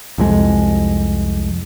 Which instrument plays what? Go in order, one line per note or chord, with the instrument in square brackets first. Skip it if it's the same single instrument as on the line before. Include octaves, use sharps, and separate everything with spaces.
[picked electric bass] C2 F2 G#3